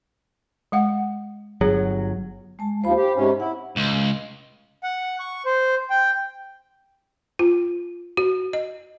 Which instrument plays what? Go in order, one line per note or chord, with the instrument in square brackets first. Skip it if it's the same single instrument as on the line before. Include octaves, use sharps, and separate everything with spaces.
[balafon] G#3 F5 F#5
[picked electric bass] G1 F#3 [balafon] G#4
[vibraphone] G#3 A5
[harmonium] D#2 F3 [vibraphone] C5 B5
[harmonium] G4
G#2 C3 C#4
[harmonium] E4 [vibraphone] F#5
[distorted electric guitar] C#2
[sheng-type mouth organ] F#5
C#6
C5
G5
[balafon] F4
F#4
D#5